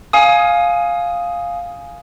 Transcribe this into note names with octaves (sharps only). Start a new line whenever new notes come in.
F5 G#5 D#6